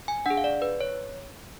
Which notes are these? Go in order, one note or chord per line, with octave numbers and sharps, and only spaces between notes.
G#5
D4 G#4 F#5
F5
D5
B4
C#5